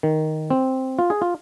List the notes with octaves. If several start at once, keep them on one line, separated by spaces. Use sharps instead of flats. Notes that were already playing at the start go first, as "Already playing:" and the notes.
D#3
C4
F4
G#4
F4